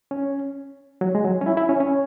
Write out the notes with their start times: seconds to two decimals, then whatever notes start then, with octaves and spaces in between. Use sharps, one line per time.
0.11 C#4
1.01 F#3
1.15 G#3
1.24 F#3
1.41 C#4
1.46 E4
1.57 E4
1.69 C#4
1.80 C#4